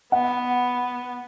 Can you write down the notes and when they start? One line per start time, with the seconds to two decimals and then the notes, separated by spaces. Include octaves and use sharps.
0.12 B3 F#5